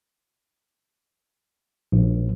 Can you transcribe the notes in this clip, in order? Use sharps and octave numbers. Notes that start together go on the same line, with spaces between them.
A#1